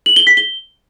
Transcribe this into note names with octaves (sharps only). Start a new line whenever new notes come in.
F#7
G7
B6
G7